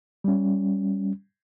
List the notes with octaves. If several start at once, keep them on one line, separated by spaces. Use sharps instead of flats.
G3 C#4